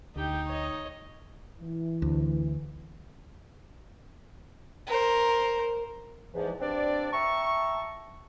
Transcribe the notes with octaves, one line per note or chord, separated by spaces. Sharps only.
D2 D#4 G4 G5
C#5 D#5
E3
D2
A#4 C5
E2 G#2 E3 F3
G2 C4 D4 D5
E5 G5 A5 A#5 C#6